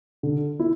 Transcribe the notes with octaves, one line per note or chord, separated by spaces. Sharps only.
D3
E4